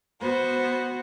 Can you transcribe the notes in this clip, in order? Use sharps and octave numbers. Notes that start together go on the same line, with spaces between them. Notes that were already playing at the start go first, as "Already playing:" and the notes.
B3 F#4 C5